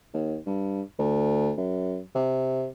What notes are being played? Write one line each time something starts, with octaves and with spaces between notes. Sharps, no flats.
D#2
G2
D2
F#2
C3